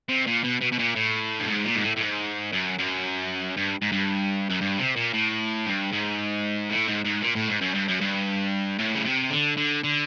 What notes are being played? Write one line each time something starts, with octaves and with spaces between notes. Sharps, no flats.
C3
A#2
B2
B2
B2
A#2
A2
G2
G#2
A#2
G#2
A2
A2
G#2
F#2
F#2
G2
G#2
G2
F#2
G2
C3
A#2
A2
G2
G#2
A2
G#2
G#2
A#2
A2
G#2
F#2
G2
F#2
G2
A2
C#3
C3
D3
D3
D3